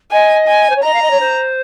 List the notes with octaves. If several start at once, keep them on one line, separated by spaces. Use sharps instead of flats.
D#5 G#5
G#5
C5
C#5
D#5 A#5
F5
D#5
C#5
C5